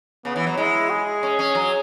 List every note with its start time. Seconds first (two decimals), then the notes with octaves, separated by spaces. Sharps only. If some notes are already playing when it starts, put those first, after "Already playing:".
0.25 C#3 B3
0.36 E3
0.47 F#3
0.57 G#3 E4
0.90 G#4
1.23 C#4
1.39 C#4
1.55 F#3